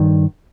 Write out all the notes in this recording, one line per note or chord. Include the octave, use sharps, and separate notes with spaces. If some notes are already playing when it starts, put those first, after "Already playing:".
Already playing: G2 D#3